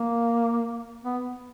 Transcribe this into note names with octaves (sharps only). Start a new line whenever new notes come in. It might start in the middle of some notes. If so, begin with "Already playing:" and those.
Already playing: A#3
B3